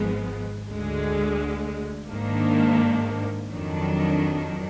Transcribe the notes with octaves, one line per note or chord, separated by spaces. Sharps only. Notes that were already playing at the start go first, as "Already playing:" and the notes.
Already playing: G#1 G#2 F3 G#3 B3
D2 D3 G#3
G#2 D#3 A#3 D4
F2 D#3 F#3 D4